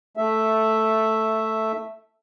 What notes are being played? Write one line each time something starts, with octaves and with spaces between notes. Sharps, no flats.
A3 E5